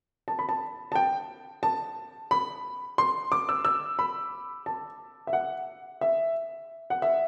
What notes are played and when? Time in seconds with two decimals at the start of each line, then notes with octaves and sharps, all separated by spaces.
0.28 A5
0.39 B5
0.49 A5
0.92 A5
0.95 G5
1.63 A5
2.31 B5
2.98 C6
3.32 D6
3.49 E6
3.65 E6
3.99 B5
4.66 A5
5.27 E5
5.33 F#5
6.01 E5
6.90 F#5
7.02 E5